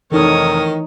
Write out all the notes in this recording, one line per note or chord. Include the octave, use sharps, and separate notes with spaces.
F1 D#3 E3 D#4 A4 C#5 D#6